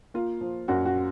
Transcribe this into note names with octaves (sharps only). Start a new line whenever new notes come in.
A#3 F4
F3
F#2 F#4
F#4